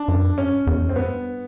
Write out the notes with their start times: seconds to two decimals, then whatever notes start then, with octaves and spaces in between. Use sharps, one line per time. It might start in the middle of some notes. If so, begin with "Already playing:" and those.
Already playing: D4
0.08 F#2
0.23 F2
0.38 G2 C#4
0.67 E2
0.82 F2
0.89 C4
0.96 G2 B3